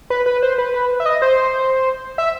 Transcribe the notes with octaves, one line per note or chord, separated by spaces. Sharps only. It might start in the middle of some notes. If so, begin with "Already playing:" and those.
B4
B4
C5
B4
B4
E5
D#5
C5
E5